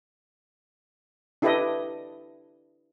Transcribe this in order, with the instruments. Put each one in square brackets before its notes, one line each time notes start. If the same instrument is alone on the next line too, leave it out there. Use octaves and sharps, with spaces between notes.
[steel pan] D4 E4 G4 A4 B4 D#5